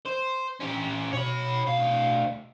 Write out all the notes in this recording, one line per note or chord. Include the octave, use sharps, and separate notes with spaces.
C5
C#4 G4
B2 C#5 B5
D2 F5